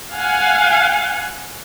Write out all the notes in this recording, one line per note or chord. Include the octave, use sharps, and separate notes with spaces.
F5 F#5 G#5